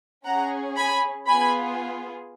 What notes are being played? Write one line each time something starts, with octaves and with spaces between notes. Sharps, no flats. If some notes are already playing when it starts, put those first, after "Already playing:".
C#4 G#4 F#5 A#5
G#5 B5
B3 F4 G#4 G#5 B5